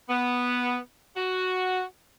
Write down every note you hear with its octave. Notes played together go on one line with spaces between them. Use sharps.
B3
F#4